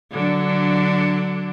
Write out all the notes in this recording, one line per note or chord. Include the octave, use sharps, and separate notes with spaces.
D3 F#3 D4